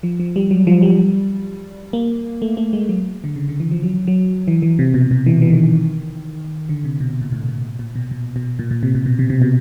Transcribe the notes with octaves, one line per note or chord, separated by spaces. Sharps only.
F3
F3
G3
F#3
F3
G3
A#3
A3
A3
G#3
F#3
D3
C#3
D3
E3
F3
F#3
F#3
E3
E3
C3
B2
B2
E3
E3
D#3
D3
C3
B2
A#2
A2
A#2
A#2
B2
B2
B2
A#2
A#2
C3
A#2
B2
C3
C3
B2